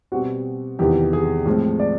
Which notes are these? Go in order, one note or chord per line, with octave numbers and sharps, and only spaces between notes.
B2 G3 C4 F#4
E2 C3 D#3 G3 B3 G4
G#4
A2 F3 G#3 C4
D5